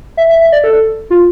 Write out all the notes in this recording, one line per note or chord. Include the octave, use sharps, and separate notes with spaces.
E5
E5
E5
D5
A4
F4